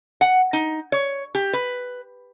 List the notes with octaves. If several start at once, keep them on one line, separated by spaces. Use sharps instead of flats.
F#5
D#4
C#5
G4
B4